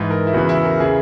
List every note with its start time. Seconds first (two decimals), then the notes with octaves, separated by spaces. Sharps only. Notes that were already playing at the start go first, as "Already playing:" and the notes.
Already playing: G#2 E3 B4
0.11 A#4
0.27 E4
0.33 E2 C#3 E3 F#4
0.49 E4
0.65 A#4
0.80 C#3 E3 G#4